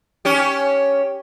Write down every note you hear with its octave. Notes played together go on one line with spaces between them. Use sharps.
C#4 G4